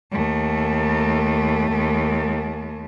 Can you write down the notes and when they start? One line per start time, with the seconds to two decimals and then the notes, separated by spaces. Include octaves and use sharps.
0.12 D#2 A3